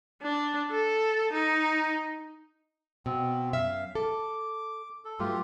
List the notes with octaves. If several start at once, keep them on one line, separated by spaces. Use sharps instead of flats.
D4
A4
D#4
B2 C4
F#2 E5 F5
A4 D6
A4
G2 F#3 A3 F4 G4